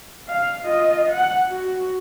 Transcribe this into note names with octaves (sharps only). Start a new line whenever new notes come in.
F5
F4 D#5
F#5
F#4